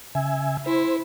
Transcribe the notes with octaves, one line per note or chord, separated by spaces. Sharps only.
C#3 E5 G#5
E4 C5